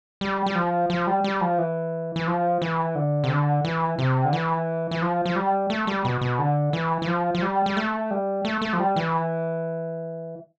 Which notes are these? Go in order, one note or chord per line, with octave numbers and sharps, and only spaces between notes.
G3
G3
F3
F3
G3
G3
F3
E3
E3
F3
E3
D3
C3
D3
E3
C3
D3
E3
E3
F3
F3
G3
A3
G3
B2
B2
D3
E3
E3
F3
F3
G3
G3
A3
G3
A3
A3
F3
G3
E3